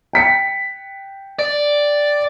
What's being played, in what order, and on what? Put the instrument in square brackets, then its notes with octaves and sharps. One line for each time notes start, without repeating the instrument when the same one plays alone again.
[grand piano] G5 B6 C#7
[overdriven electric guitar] D5